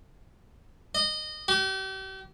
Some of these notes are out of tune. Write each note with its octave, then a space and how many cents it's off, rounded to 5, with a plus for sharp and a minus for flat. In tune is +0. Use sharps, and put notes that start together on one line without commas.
D#5 -20
G4 -40